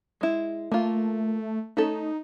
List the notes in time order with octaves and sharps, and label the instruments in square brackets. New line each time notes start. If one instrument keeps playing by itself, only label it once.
[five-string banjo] G#3 E4
[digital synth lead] A3 [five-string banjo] A#3 F4
[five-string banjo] A3 C#4 A4 [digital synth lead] D#4